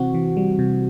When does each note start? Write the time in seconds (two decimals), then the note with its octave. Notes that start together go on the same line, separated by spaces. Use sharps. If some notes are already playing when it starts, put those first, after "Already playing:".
Already playing: C3 E3 C4 F#4
0.14 E3
0.37 G3
0.59 C3